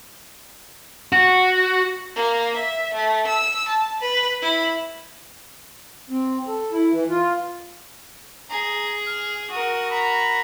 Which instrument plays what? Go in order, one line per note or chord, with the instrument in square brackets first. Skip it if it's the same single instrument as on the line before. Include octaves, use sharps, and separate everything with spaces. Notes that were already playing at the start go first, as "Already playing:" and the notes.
[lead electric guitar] F#4
[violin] A#3
E5
A3
E6
A5
B4
E4
[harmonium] C4
A4
E4
E3
F4
[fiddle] G#4 [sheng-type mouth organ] A#5
[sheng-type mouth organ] F6
[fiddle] F#4 A#4 [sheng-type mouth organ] D#6
[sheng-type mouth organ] A#5 B5